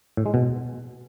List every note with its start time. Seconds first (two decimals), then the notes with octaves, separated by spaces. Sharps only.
0.17 A2
0.26 G#3
0.34 B2